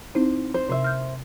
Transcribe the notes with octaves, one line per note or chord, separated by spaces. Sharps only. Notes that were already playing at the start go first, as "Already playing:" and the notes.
C4 D#4 E4 C5
C5
C3 C5 E5
F6 G6